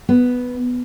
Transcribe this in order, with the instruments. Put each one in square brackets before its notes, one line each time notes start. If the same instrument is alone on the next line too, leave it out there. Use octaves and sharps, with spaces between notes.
[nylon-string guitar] B3